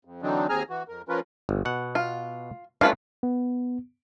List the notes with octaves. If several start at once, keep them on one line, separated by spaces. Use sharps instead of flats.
F2
D3 E3 F#3 C4 D4 D#4
D#2 C4 G#4 G#5 A#5 F6
E3 F#4
F2 A#4
F3 C#4 F4 A#4 B4
G1
B2 F#5
F4
A3 C#4 D4 F4 B4 F5
B3